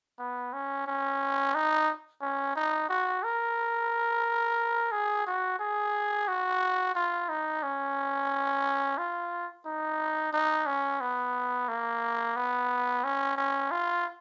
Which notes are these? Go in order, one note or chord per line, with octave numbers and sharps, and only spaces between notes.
B3
C#4
C#4
D#4
C#4
D#4
F#4
A#4
G#4
F#4
G#4
F#4
F4
D#4
C#4
F4
D#4
D#4
C#4
B3
A#3
B3
C#4
C#4
F4